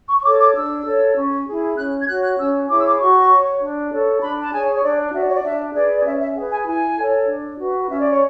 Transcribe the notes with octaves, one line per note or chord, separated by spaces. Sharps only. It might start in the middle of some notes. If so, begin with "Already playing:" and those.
C#6
C#6
A4 C#5 D6
D6
D4 E6
A4 C#5
C#4
E4 G#4
C#4 F#6
G#6
F#4 C#5 F#6
F#6
C#4 E6
E4 G#4 C#5 D6
E6
D6
F#4 C#6
C#5
D4
A4 C#5
D4 B5
A5
G#4 C#5 G#5
C#5
D4 D5
F#4 C#5 E5
D5
C#5
D5
D4 E5
G#4 B4 D5
D5
C#4 E5
E5
G#4 B4 F#5
G#5
E4 G#5
A4 C#5
D4
F#4 B4
C#4 E5
D5
C#5